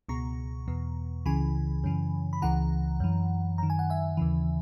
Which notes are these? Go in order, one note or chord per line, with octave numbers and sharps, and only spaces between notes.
C#2 B2 A#5 C#6
E2 B2
C#2 C#3 E3 G#5 B5
F#2 C#3 E3
B5
C#2 C#3 E3 F#5 A#5
F#2 E3
F#2 D#3 A#5
G#5
F#5
E5 G#5
D#2 C#3 E3